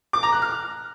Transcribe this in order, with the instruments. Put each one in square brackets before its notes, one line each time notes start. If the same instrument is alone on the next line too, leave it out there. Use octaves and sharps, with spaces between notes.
[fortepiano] D6
A#5
F#6
F6